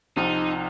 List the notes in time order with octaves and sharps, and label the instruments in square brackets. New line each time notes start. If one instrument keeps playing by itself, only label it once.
[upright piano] C2 C3 F3 [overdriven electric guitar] D#4